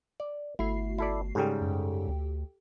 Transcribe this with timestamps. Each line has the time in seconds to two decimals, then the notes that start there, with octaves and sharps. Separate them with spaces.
0.20 D5
0.59 G1 A3 E4 F#4 C7
0.98 E4 A4 D5
1.35 G#2 C#3 G3 G4 A4 G5
1.61 F#2
2.07 D2